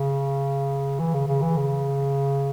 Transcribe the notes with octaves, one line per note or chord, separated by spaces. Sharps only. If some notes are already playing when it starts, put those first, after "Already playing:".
Already playing: C#3
E3
C#3
C#3
E3
C#3